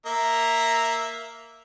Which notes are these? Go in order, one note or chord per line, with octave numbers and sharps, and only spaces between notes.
A#3 E5 A#5